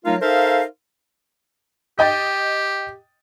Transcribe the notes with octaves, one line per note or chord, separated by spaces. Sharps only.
F#3 A3 D#4 F4 A#4 F5
D#4 A4 A#4 C5 E5 F5
G4 D#5 G5 A6